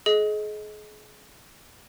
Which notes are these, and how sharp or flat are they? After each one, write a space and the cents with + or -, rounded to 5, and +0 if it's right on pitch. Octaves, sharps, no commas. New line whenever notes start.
G#4 +35 D#5 +10